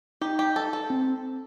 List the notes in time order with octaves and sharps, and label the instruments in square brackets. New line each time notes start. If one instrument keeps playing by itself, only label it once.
[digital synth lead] D#4 [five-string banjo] G4
[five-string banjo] G4
A4
A4
[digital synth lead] C4